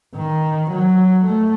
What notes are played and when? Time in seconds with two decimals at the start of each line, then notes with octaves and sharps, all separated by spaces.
0.15 D#3
0.71 F#3
1.25 A3